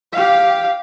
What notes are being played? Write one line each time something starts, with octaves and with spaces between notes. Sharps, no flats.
G4 F5